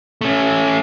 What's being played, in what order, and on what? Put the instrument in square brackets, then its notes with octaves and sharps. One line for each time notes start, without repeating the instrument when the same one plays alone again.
[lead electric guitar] A3 C#4